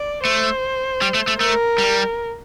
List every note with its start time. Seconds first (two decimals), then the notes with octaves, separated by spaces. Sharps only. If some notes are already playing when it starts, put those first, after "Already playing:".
Already playing: D5
0.24 A3 C5
1.02 G3
1.14 A3
1.27 A3
1.40 A3 A#4
1.78 G3